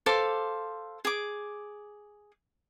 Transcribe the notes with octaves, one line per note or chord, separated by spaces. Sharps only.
A4 C5 F5 D6
G#4 D6